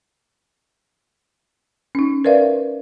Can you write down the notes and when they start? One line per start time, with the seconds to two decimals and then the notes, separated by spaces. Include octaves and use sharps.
1.95 C#4 D#4
2.25 A#4 B4 D5 E5 F5